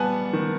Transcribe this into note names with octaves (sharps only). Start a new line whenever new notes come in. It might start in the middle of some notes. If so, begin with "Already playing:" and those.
Already playing: G3 B3 F#5 G#5 A5
D#3